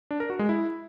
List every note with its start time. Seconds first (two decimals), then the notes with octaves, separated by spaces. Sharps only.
0.11 D4
0.20 A#4
0.30 F#4
0.39 G#3
0.49 E4